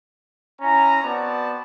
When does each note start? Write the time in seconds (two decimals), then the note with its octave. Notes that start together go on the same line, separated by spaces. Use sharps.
0.61 C#4 E4 G#5 A#5
1.04 B3 C4 F#4 D5 A5